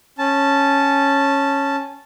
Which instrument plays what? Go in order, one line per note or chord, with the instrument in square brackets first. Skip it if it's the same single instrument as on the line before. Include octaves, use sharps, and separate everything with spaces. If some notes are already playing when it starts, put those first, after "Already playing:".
[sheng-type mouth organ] C#4 A5